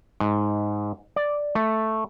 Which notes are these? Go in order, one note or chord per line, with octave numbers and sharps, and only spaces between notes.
G#2
D5
A3